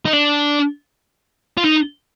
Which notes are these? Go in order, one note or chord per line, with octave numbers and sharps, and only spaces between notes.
D#4
D4
F4
D#4